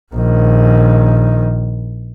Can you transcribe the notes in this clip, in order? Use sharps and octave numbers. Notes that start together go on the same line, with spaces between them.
A#1 D#3